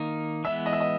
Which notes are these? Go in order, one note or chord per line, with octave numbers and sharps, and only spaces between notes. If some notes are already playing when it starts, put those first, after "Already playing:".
Already playing: D#3 A#3 D#4
E3 G#3 B3 E5
D#5
E5
D#5